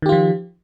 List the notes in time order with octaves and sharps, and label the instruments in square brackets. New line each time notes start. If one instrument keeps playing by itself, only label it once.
[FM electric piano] D#3
G4
F4
F3